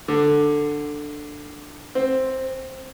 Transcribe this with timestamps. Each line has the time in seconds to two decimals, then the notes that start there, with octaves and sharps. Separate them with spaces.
0.08 D3
1.95 C4